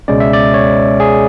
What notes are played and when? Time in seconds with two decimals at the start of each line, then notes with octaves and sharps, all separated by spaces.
0.08 C#2 B2 G#3 C#4 D5
0.20 E5
0.33 D5
0.54 C#5
1.00 G#4